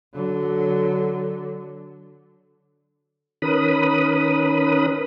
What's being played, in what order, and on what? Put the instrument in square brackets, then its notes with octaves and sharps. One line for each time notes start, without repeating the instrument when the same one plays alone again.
[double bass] D3 F#3
[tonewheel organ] D#3 C#4 A#4 B4 B5 D#6